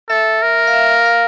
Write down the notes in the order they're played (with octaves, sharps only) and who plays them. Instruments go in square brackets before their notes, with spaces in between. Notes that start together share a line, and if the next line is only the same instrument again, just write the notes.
[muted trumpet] A4 [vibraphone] E5
[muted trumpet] A#4
[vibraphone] F5
E5
F5
F5